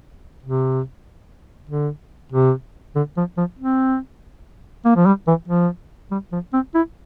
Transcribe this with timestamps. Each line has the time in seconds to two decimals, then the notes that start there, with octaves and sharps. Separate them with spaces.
0.43 C3
1.69 D3
2.32 C3
2.96 D3
3.17 F3
3.37 F3
3.59 C4
4.85 A#3
4.97 F3
5.06 G3
5.27 E3
5.48 F3
6.11 G3
6.32 F3
6.53 C4
6.75 E4